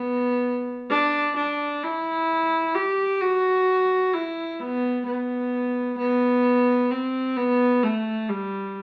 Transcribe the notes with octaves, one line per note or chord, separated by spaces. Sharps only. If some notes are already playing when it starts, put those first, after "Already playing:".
Already playing: B3
D4
D4
E4
G4
F#4
E4
B3
B3
B3
C4
B3
A3
G3